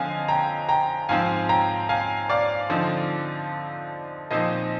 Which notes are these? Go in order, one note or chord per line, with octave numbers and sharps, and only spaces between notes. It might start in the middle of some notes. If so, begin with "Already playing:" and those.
Already playing: D3 F3 C4 D#5 F5 G#5
G5 A#5
G5 A#5
G#2 F3 C4 F5 G#5
G5 A#5
F5 G#5
D5 F5
D3 F3 C4 D#4
A#2 F3 C4 D#4 C5 D#5